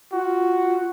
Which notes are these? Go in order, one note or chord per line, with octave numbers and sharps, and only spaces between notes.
F4 F#4